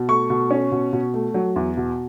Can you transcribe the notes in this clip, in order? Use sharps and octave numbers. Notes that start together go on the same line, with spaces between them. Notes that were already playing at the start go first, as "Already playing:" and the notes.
Already playing: B2
A3 C#6
B2
C#4
B2
B2
A3
F#3
E2
B2